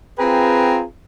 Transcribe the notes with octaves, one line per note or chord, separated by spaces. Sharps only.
C4 F4 G#4 B4 G5 A#5